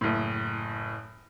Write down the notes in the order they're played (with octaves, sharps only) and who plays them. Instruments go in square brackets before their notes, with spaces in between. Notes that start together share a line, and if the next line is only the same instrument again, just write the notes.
[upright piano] F#1 A2